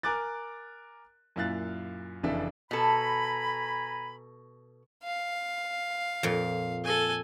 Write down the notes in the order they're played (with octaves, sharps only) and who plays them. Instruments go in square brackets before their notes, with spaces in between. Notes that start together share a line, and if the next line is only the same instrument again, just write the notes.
[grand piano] A#4 G#5 D6 F#6 A6
F#2 A#2 E4 F5 F#6 A6
F1 C#3 E3 D4 E5
[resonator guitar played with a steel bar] B2 A4 [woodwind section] G#5 A#5 B5
[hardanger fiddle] F5
[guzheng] F2 A#2
[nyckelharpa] A4 G#5